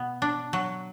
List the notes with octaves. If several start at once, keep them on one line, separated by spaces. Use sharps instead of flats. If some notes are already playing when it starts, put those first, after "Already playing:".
Already playing: B2 B3
D4
F#3